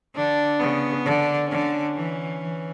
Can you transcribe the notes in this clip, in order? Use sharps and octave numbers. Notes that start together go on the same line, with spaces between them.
D3 D4
C#3 B3
D3 D4
D3 C#4
E3
E3